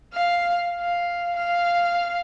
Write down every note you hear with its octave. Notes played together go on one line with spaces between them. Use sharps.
F5
F5
F5